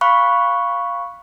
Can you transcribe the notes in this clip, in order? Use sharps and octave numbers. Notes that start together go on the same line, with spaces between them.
F5 B5 C#6 F#6